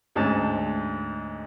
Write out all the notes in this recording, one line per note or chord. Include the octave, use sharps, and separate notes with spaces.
D2 G#2 C#4 A5